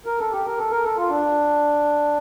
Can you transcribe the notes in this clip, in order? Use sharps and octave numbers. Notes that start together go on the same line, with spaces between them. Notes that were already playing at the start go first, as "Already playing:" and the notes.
A#4
A4
G4
A#4
A4
A#4
A4
F4
D4